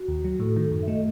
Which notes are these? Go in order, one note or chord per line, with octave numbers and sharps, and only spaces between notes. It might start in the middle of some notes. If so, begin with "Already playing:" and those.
Already playing: F#4
D#2
F#3
A2 A4
D#3 A4
F#2
E5
A3 D#5